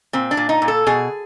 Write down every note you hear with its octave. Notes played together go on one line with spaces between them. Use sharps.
A#2 C4
D4
A#2
D#4
A#2
A4
B2 G#4